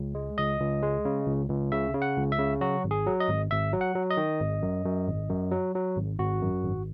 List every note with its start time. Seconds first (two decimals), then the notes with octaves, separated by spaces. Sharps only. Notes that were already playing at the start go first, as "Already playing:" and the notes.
Already playing: C#2
0.15 G#3
0.38 C#2 D#5
0.60 C#2
0.83 G#3
1.05 C#3
1.27 C#2
1.49 C#2
1.72 C#3 E5
1.94 C#3
2.02 F#5
2.17 C#2
2.32 E5
2.39 C#3
2.61 F#3 F#4
2.84 G#1
2.91 G#4
3.06 F#3
3.20 D#5
3.29 G#1
3.51 G#1 E5
3.73 F#3
3.81 F#5
3.95 F#3
4.11 D#5
4.17 D#3
4.39 G#1
4.62 F#2
4.85 F#2
5.08 G#1
5.30 F#2
5.51 F#3
5.75 F#3
5.97 G#1
6.19 G#1 F#4
6.42 F#2
6.64 G#1